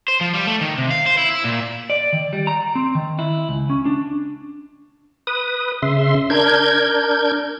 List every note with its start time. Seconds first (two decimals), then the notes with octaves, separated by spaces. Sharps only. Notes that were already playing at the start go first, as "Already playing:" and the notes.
0.08 C5
0.21 F3
0.33 G3
0.47 A3
0.61 D#3
0.78 C3
0.91 F5
1.06 C5
1.18 E4
1.30 E4
1.44 A#2
1.90 D5
2.13 D#3
2.33 G3
2.47 A#5
2.75 C4
2.95 D#3
3.19 E4
3.49 C#2
3.70 C#4
3.86 D4
5.27 B4 D#6
5.82 C#3 E5 C6
6.30 D4 A#4 G6 G#6